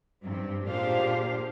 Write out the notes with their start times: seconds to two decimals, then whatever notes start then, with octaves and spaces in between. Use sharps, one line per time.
0.22 G2 C4 G4
0.64 A#2 D4 G4 G#4 C5 F5